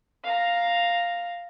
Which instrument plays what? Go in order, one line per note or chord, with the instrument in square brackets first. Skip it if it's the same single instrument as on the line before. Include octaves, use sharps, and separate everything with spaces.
[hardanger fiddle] F5 A#5